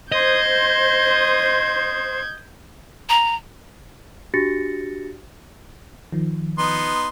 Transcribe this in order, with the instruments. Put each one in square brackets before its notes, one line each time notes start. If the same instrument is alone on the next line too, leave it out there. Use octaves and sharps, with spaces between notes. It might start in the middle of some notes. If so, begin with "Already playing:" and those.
[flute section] C5 [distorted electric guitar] D#5 [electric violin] G6 G#6
[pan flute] A#5
[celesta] D4 F#4 G4 A6 A#6 C#7
[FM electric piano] D#3 F3
[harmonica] B3 D#4 C6